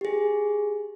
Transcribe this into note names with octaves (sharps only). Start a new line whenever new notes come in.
G4 G#4